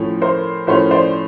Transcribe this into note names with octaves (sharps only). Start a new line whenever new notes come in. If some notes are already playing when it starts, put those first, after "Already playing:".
Already playing: A2 F3 A3 C#4
A#4 C5
A2 F3 A3 C#4 A#4 C5
C5 D5